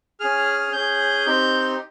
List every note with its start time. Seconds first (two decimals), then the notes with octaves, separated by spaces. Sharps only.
0.20 C#4 G#4 F6
0.73 C#4 G#4 G6
1.26 C4 D#4 G4